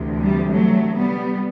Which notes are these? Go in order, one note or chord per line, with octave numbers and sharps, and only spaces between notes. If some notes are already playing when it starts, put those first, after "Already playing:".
Already playing: D2 C3 E3
G3
F#3 A3
G3 B3